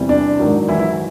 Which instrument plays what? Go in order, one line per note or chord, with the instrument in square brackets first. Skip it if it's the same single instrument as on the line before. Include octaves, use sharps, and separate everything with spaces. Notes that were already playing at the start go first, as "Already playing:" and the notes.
Already playing: [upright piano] E2 C3 E3 G3
D4
G#2 D#3 F#3
E3 E4
E3 E4